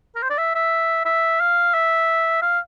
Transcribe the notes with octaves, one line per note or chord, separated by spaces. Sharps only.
A#4
C5
D5
E5
E5
E5
F5
E5
F5